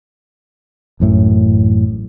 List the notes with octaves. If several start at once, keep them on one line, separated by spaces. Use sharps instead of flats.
A1 F#2 A2